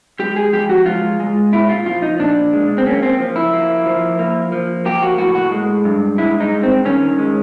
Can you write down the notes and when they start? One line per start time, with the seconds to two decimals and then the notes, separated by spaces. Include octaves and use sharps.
0.19 G#3 G4
0.36 G#4
0.53 F3 G4
0.69 F#4
0.86 G#3 F4
1.20 G#3
1.52 A#2 E4
1.69 F4
1.86 F3 F4
2.02 D#4
2.20 A#2 D4
2.53 G#3
2.78 C4
2.86 A#3 C#4
3.03 C4
3.20 F3
3.36 E4
3.53 A#3
3.86 F3
4.19 A#3
4.52 F3
4.85 A#3 G4
5.02 F#4
5.18 A2 F#4
5.35 F#4
5.52 G#3
5.85 G2
6.18 G#3 E4
6.40 D#4
6.52 G2
6.63 C4
6.85 D#3 C#4
7.18 G#3